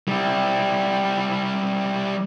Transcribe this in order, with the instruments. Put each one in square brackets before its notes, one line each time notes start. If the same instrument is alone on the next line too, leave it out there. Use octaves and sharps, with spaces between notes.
[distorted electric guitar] G3 E4